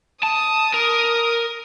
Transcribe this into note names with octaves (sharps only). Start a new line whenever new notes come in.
A5 D#6
A#4